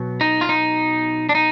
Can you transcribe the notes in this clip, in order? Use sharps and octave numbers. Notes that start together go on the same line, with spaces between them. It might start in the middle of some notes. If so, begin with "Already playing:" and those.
Already playing: B2 F#3 B3
D#4
F4
D#4
D4
D#4